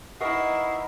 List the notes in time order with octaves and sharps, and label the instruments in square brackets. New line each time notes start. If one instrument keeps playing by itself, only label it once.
[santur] D#4 A#4 B4 [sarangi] E4 [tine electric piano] F#5 C#6 D#6 [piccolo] C7